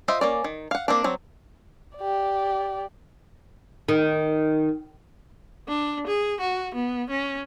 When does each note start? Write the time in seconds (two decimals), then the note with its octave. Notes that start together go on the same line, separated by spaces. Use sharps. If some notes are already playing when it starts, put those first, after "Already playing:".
0.08 F4 C5 D#5 E5 G5
0.21 A#3 C#4 D5
0.44 D#3
0.71 F5 F#5
0.88 A#3 C4 D4
1.04 F#3 C4
1.98 G4 D5
3.89 D#3
5.68 D4
6.07 G#4
6.40 F#4
6.74 B3
7.10 C#4